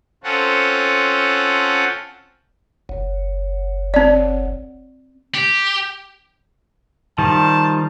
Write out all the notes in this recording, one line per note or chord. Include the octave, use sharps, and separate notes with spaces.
C4 C#4 F4 A4 F#5
F#1
C4 D5
G4
D#3 F3 G3 A5